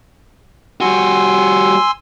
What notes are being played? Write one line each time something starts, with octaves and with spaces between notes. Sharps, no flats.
G3 F#4 G#5 C6 E6